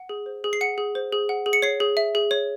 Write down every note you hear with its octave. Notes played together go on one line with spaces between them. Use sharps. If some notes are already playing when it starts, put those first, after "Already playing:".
Already playing: F#5
G#4
C5
G#4
C7
F#5 C#7
G#4
C5
G#4
F#5
G#4
C#7
C#5 C7
G#4
E5
G#4
C#5